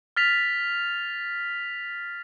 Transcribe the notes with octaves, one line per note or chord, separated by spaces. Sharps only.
F6 A6 B6 F7